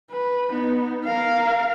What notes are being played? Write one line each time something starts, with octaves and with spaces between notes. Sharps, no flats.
B4
B3 D#4
A#4 F5